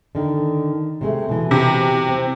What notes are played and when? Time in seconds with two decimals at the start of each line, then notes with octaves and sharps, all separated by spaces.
0.15 D3 D#3
1.01 C3 G#3 A3
1.29 B2 E3
1.51 C3
2.09 C4